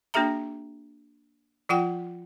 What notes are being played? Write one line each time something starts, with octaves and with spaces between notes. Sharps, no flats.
A#3 D4 F#4 G#4 E5 A#5
F3 F4 F#5 G5